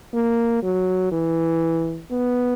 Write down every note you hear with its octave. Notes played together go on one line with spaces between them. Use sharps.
A#3
F#3
E3
B3